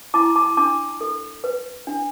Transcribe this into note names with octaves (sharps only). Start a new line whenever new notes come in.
E4 A5 D6
A5 D6
D4 A5 D6
A4
B4
D4